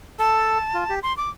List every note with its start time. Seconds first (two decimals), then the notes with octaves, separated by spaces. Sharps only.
0.19 A4 A5
0.74 F4
0.90 G4
1.03 C6
1.17 D6